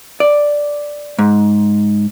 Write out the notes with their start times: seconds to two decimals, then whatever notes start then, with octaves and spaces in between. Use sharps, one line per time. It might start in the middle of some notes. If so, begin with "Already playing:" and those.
0.20 D5
1.19 G#2